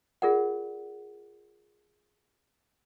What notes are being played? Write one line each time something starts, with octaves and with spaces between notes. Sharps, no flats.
F4 G#4 A#4 D5 F#5